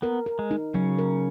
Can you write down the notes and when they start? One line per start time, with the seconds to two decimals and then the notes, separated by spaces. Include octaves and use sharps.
0.02 B3 A#4
0.26 A#4
0.39 G#3
0.51 D#4
0.74 C#3 F#3 C#4
0.98 A#4